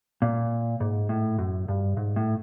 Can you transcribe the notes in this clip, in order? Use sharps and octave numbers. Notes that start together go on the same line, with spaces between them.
A#2
G#2
A2
F#2
G2
G#2
A2